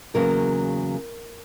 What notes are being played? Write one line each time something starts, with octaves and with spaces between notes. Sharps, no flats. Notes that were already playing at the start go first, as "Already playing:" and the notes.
E2 C#3 F#3 A#3 A#4